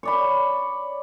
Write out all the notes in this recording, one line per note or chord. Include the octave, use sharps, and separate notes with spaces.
C#5 D5 B5